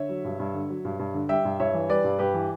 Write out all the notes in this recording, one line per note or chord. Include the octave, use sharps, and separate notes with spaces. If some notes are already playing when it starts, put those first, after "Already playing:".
Already playing: D3 C#5 E5
F#3
G2
G2
D3
F#3
G2
G2
D3
G3 E5 G5
G2
G2 C#5 E5
E3
G3 B4 D5
G2
G2 G4 B4
E3